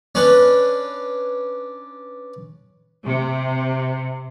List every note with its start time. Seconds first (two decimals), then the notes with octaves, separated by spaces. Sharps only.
0.15 C#4 D4 B4
3.05 C3